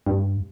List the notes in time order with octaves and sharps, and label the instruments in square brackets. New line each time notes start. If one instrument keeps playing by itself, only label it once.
[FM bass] G2